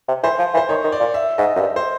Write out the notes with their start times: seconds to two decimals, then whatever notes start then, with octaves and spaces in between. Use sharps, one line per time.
0.08 C3
0.23 E3 C5
0.39 F3
0.54 E3
0.57 C5
0.69 D#3 C#5
0.84 D#3
0.92 D5
1.00 A#2
1.14 E5
1.38 G#2 D#5
1.56 F#2
1.61 G2
1.76 C5